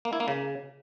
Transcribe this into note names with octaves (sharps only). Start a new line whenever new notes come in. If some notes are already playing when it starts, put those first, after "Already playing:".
A#3
E4
A#3
C#3